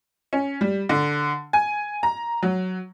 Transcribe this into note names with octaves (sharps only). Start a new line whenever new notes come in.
C#4
G3
D3
G#5
A#5
F#3